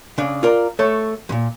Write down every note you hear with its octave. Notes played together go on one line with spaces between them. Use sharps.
C#3 D4
F4 A#4 D5
A3 A4 C#5
E2 A#2